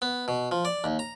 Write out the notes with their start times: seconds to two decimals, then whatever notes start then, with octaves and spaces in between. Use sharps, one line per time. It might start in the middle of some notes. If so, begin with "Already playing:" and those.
0.02 B3
0.28 B2
0.51 F3
0.65 D5
0.84 D#2
0.99 A#5